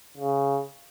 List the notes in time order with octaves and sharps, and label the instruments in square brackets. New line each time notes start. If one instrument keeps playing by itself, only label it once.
[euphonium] C#3